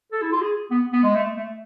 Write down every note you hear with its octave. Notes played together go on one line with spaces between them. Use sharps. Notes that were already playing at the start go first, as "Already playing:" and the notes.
A4
E4
F4
G#4
B3
B3
G#3
A3
A3